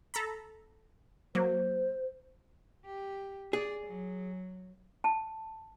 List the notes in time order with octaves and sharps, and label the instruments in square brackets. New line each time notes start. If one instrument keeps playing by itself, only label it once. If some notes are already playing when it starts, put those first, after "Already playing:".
[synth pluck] A4 A#5 B5
[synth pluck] F#3 A#3 [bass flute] C5
[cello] G4
[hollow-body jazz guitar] G#4 [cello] D5
[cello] F#3
[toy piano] A5